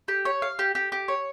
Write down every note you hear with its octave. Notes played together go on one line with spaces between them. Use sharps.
G4
C#5
F5
G4
G4
G4
C#5